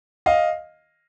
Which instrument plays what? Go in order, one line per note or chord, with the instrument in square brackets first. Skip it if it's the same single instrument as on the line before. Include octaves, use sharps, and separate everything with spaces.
[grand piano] D#5 F5